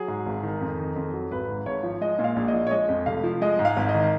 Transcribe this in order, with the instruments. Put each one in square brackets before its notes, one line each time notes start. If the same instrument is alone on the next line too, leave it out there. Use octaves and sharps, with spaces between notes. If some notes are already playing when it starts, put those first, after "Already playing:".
Already playing: [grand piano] F#3 G#4
G#2
G#1
D#3
F2
D#3
F2
F#3
G#1 B4
G#2
G#1 C#5
F3
G#3 D#5
A#2
F5
A#1
D#5
F3
C#5
G#3 D#5
F2
F1 F5
F3
G#3 D#5
G#2
F5
G#1
D#5
D#3